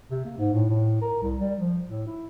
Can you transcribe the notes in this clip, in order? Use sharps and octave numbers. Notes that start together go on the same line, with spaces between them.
C3
A#3
G#2
A2
A2
A#4
C2
G3
F3
A2
E4